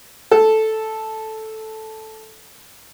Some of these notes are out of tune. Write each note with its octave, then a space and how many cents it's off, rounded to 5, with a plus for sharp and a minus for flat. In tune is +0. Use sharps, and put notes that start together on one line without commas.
A4 -5